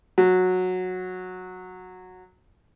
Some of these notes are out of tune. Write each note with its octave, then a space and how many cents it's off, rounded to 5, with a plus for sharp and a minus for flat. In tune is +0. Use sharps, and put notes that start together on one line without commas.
F#3 -10